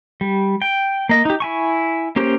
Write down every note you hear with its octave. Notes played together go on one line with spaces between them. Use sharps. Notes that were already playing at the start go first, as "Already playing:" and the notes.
G3
G5
A#3 D#5
D#4 G4
E4 G#5 C#6
A#3 C#4 G4 C5